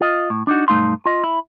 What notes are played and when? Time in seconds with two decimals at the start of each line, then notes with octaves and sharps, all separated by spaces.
0.01 F4 D#5
0.30 A2
0.47 D4 D#4 F#4
0.68 B1 G2 A3 D#4 F5 C6
1.06 F4 D#5
1.24 E4